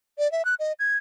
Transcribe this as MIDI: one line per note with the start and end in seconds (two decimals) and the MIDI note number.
0.18 0.30 74
0.32 0.45 76
0.45 0.55 90
0.60 0.73 75
0.79 0.97 92